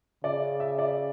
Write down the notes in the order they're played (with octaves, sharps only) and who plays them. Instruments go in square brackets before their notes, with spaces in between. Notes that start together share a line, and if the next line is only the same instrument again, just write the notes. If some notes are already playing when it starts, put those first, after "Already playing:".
[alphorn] C#3 [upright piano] D5
[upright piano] E5
D5